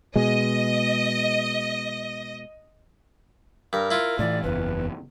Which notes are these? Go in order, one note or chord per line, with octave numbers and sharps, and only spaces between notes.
B2 G#3 D#5
G2 A#4
E4 F4
A2 D#3 E3 D5
F#1 E2 B4